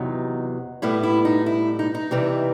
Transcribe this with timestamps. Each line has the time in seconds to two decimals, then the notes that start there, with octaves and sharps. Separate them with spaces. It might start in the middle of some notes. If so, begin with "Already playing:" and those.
Already playing: E2 C3 F#3 B3 D#4
0.82 A2 G3 B3 E4
1.03 E4
1.25 D#4
1.46 E4
1.79 D#4
1.95 D#4
2.11 C3 E3 G3